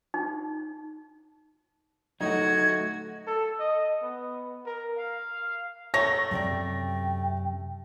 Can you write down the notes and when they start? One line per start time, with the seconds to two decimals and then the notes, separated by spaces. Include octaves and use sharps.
0.14 D#4
2.21 F#3 A3 D#4 F#4 G#6
3.27 A4
3.59 D#5
4.02 B3
4.66 A#4
4.98 F5
5.94 F#3 A3 C#5 A#6
6.31 F#2 C3 D5 G5